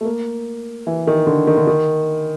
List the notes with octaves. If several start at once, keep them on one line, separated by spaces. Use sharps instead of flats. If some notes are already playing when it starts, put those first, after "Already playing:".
A3
A#3
E3
D#3
D3
D#3
D3
D#3